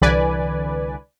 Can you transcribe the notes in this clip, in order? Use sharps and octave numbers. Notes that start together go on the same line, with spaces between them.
C2 D3 E3 B4 D5 G#5